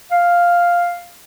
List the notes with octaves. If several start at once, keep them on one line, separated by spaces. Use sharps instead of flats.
F5